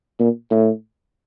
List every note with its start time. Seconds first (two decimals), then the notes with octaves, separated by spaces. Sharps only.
0.19 A#2
0.51 A2